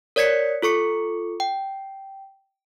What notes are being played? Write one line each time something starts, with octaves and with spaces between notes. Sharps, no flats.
A#4 C#5 D5 G#6 B6 C#7
F4 A4 C#6 C#7
G5